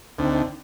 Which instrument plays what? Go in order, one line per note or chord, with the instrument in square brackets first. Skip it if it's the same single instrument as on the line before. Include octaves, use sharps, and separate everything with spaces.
[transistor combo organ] D2 [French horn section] C4 D#4